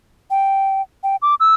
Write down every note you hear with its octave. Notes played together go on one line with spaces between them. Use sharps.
G5
G5
D6
E6